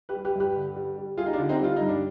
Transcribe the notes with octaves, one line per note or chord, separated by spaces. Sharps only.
G4 B4
G3
G4 B4
G2 G4 B4
D3
G3
G3
G3 F4 G#4
D#4
D4 F4
D3
C4 D#4
G3 F4
G2 D#4
D4